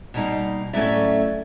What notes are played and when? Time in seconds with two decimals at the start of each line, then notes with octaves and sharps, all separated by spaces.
0.14 B2 G3 A#3 D#4
0.73 A2 F#3 A3 C#4 D5 E5